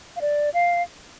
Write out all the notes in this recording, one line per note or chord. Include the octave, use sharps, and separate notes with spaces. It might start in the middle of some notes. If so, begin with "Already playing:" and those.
F5
D5
F5